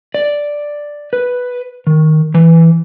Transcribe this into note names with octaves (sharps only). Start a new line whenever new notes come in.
D5
B4
D#3
E3